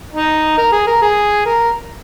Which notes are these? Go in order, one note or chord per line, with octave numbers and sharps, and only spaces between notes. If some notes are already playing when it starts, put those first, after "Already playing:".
D#4
A#4
G#4
A#4
G#4
A#4